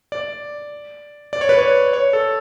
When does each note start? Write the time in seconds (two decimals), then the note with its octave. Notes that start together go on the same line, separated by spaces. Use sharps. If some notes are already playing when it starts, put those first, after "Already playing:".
0.12 D5
1.33 D5
1.41 C#5
1.49 B4
1.59 C#5
1.93 C#5
2.13 A4